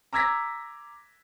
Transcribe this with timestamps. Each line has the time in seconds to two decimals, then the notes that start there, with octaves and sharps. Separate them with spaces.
0.13 A#5 D6 E6 G#6 A#6 B6